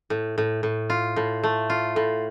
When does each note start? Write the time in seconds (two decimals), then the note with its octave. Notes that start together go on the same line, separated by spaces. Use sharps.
0.10 A2
0.38 A2
0.63 A2
0.90 F4
1.16 A2
1.43 A3
1.70 F4
1.96 A2